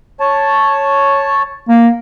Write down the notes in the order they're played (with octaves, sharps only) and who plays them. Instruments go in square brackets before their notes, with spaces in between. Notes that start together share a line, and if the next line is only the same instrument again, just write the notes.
[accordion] C#5 A5
[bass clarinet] A#3